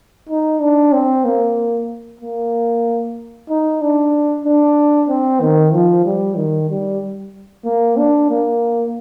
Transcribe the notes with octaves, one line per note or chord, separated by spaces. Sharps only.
D#4
D4
C4
A#3
A#3
D#4
D4
D4
C4
D#3
F3
G3
D#3
G3
A#3
D4
A#3